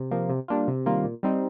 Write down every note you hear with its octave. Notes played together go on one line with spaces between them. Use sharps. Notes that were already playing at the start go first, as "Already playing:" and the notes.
Already playing: C3
F3 A#3
C3
G3 A#3 D4 F4
C3
D#3 G3 A#3 F4
A#2
G3 C4 D#4